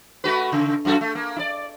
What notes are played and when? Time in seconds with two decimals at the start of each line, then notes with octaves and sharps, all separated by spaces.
0.24 A3 F#4 B4
0.52 C#3
0.85 F#2 F#4 A4
1.01 A3
1.15 A#3
1.36 E4 D5